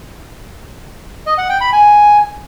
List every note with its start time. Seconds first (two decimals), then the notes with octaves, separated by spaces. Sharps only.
1.26 D#5
1.38 F#5
1.49 G5
1.61 B5
1.73 G#5